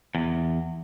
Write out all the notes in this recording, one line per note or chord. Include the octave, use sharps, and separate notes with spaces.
E2